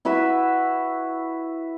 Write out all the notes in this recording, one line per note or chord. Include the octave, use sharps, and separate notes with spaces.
E4 F#4 B4 E5